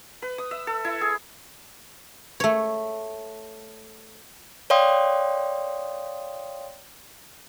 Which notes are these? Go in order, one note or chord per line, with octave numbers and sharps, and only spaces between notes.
B4
D#6
E5
A4
E4
G#4
A3 C#5
C#5 D5 F5 G5 C6 D#6